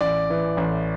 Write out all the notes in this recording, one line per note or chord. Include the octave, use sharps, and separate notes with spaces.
A1 D5
E3
A1